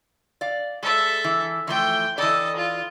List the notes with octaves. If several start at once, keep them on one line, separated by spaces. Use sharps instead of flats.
D5 F5
G#3 A4 E5
E3
E3 F3 A3 G5 C6
E3 A4 D5 D#5
F4